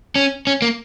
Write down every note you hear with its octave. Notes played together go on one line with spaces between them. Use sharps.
C#4
C#4
A#3